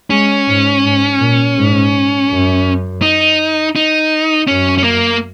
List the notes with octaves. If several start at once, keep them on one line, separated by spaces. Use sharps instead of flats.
G#3 C#4
G#2
G#2
A#2
G#2
F#2
D#4
D#4
F#2 C#4
C#4
A#3